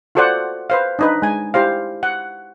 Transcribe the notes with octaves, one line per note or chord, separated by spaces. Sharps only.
F4 F#4 A4 C5 D5 F#5
B4 C5 F5
D4 D#4 B4
G#3 G#5
E4 G4 C5 F5
F#5